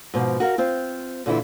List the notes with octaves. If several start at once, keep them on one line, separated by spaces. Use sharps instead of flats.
G#2 B2 D#3 F3
F#4 A#4 F5
C4 F4
A#2 D3 E3 E4 F4